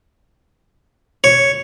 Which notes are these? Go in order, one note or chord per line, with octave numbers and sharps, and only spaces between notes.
C#5